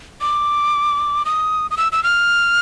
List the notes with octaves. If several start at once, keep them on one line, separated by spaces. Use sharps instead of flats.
D6
D#6
D#6
E6
E6
F6